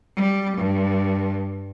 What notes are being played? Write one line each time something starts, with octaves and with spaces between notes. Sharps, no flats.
G3
G2